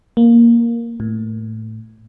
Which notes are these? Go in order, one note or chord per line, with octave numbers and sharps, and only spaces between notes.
A#3
A2